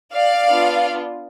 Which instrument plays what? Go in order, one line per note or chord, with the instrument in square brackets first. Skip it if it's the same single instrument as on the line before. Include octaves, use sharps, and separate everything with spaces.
[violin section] D5 F5
B3 D4 F4